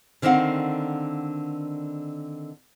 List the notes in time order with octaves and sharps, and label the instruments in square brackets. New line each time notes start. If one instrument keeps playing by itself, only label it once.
[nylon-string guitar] D3 D#3 B3 C4 F5 F#5